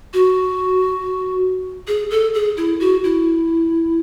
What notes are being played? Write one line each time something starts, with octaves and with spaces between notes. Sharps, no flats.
F#4
G#4
A4
G#4
E4
F#4
E4